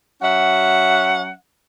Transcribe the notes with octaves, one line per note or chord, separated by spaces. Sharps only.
F#3 C#4 E5 F#5